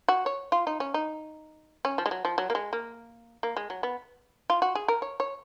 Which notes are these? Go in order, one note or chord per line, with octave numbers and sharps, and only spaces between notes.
F#4
C#5
F4
D#4
C#4
D#4
C#4
F3
G#3
F#3
F3
F#3
A#3
G#3
A#3
A#3
G#3
F#3
B3
F4
F#4
G#4
A#4
C#5
C#5